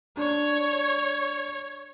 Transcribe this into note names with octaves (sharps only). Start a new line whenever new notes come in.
D4 C#5